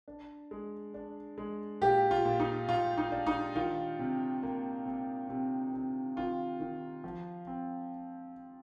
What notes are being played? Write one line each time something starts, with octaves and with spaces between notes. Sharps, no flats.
D4
G#3
D4
G#3
A#2 G4
F4
A#2
D#4
A#2 F4
D#4
D4
D#4
D#3 F4
C3
A#3
C3
C3
C3
D#3 F4
D#3
F3
C4